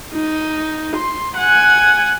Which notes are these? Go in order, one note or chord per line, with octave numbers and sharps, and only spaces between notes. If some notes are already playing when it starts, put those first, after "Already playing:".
D#4
C6
F#5 G#5